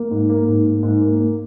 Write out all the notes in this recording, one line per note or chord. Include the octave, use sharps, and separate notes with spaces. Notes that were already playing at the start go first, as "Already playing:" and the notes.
Already playing: A#3
G#2
A#3
G#2
A#3
G#2
A#3
A#3